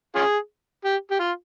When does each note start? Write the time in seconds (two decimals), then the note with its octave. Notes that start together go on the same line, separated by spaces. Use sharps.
0.16 C#4 F4 G#4
0.85 G4
1.11 G4
1.20 F4